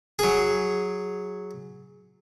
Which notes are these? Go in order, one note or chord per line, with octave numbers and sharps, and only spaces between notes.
F#3 G#4